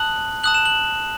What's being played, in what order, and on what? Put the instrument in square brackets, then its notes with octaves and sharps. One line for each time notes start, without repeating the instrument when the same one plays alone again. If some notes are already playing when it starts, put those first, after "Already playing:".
Already playing: [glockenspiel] A5 D#6 F#6 F#7
A5 D#6 F#6 F#7
E7
F#7